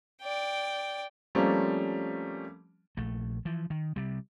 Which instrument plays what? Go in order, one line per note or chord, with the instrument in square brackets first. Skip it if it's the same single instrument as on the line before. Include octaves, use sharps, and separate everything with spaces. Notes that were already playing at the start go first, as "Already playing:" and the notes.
[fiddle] D5 G5
[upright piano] F3 G3 A3 A#3 C4 C#4
[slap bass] A#1 A3
E3 F3
D#3
C3 G3